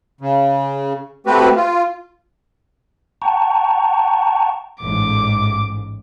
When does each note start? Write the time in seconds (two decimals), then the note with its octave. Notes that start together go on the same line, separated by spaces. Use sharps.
0.21 C#3
1.27 A3 C4 F#4 G4 B4
1.56 F4
3.22 F#5 G5 A5 A#5 C#6
4.81 A1 G#2 D6